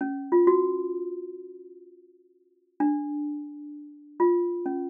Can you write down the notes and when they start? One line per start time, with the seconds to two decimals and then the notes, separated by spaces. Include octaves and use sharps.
0.01 C#4
0.32 F4
0.47 F#4
2.80 D4
4.20 F4
4.66 C#4